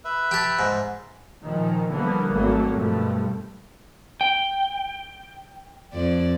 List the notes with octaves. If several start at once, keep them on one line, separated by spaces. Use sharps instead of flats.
B4 E5
G4 A5
G#2
A#2 D#3 F3
D3 E3 F3 G3 A#3 B3
G#1 F#3 A3 A#3
G2 B2 F3 A3
G5
F2 D5